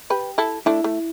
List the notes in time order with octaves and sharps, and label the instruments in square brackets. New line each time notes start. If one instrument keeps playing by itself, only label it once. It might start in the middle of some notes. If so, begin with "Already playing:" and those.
[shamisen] G4 B4
E4 A4
[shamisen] A3 D4 [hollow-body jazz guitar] E4
[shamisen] A3